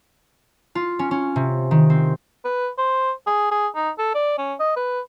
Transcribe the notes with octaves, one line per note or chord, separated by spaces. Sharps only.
F4
C#4
C#4
C3
D#3
C4
B4
C5
G#4
G#4
D#4
A4
D5
C#4
D#5
B4